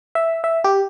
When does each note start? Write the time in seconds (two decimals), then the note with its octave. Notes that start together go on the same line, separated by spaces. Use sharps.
0.15 E5
0.44 E5
0.64 G4